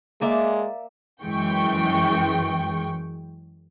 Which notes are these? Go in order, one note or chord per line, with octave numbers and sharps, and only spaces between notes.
G#3 A#3 D5 E5
F#2 E3 G#3 G5 C#6